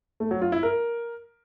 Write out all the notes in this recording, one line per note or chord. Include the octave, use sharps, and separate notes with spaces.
A3
F#3
F4
E4
A#4